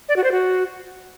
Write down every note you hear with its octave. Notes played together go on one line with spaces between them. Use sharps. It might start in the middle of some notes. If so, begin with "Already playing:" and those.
D5
F#4
C5
F#4